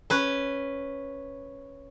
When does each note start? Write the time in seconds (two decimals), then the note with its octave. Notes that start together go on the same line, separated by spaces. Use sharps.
0.10 C#4 B4